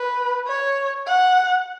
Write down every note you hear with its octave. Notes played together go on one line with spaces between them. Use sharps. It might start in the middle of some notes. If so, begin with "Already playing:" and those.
Already playing: B4
C#5
F#5